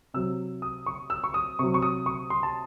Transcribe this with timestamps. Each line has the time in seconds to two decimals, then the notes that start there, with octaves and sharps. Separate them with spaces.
0.14 C3 F#3 E6
0.62 D#6
0.86 C#6
1.10 E6
1.24 C#6
1.34 D#6
1.59 C3 F#3 C#6
1.74 C#6
1.82 D#6
2.06 C#6
2.30 C6
2.43 A5